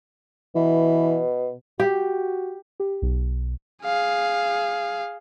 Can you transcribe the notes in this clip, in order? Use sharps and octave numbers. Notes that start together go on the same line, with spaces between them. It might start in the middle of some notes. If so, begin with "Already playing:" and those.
B2 E3
F#4 G4
G4
B1
G#4 F5